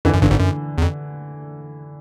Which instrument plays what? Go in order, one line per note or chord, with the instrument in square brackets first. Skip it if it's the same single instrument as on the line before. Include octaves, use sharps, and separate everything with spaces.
[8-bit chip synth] F2 [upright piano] D3 E3
[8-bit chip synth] F#2
[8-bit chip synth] G1 G2 [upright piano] D3
[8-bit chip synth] G#1 G#2
F#2
E2
F2